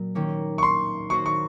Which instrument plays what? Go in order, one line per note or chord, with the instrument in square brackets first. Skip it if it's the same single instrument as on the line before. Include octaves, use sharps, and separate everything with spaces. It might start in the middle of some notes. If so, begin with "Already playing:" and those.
Already playing: [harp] A#2 F#3
D#3 A#3 C#4
[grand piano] C#6
C6
[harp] A#3 C#4 F#4 C5 D#5 [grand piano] C#6
[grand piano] C#6